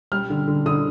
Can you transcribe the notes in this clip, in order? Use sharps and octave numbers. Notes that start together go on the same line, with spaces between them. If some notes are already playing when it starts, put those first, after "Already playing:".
G3 F6
D3
D3
D3 D#6